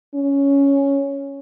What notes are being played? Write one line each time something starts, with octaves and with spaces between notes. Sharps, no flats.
C#4